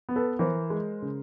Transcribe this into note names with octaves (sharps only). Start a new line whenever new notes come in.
B3
A4 B4
E3 A#4 C5
G#3
C#3